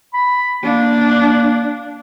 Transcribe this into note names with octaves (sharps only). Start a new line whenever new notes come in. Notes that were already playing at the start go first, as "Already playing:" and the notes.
B5
A#3 D4